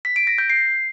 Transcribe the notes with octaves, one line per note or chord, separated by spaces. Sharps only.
B6
D7
A#6
G6
C7